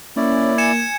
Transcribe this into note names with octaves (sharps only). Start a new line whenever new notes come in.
A#3 C#4 E4 D5
G#5 G#6 C#7 E7